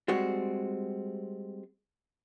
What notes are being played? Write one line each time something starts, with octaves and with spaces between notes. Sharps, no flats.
G3 G#3 C4 F#4